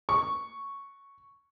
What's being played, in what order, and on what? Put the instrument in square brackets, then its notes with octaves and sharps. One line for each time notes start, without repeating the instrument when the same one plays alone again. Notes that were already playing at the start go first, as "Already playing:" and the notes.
[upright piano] C#6